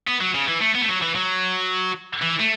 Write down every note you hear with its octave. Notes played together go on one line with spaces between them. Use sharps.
B3
F#3
C#3
E3
A3
B3
A3
F#3
E3
F#3
E3
A3